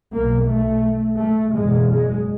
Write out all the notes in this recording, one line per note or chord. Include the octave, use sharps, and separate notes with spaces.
B1 B2 A#3
A3
A3
F#1 E2 B2 G#3
G#3